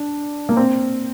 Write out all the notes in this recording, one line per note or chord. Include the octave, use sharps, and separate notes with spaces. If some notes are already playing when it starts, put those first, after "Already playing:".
Already playing: D4
A#3
C4